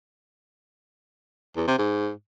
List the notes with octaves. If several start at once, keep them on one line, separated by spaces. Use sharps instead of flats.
E2
C3
G#2